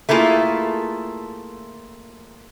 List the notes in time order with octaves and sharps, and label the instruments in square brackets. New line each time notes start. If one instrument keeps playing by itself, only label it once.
[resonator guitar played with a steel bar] A3 A#3 E4 F4 G#4